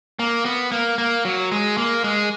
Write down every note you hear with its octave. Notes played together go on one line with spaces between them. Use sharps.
A#3
B3
A#3
A#3
F#3
G#3
A#3
G#3